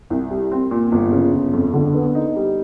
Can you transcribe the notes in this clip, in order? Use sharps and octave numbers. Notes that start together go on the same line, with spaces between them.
C2
G3
C4
A#2
G1
C#3
G1
F2
D3
B3
D#4
G3